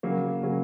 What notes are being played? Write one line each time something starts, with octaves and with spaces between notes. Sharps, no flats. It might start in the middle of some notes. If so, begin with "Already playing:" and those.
C#3 F#3 A#3
C#3 F#3 A#3